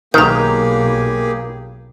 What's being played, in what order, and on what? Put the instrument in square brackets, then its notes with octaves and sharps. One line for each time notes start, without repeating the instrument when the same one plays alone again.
[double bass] B1 [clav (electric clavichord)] D#3 [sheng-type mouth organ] A#3 G4 G#4 [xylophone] A#5 G6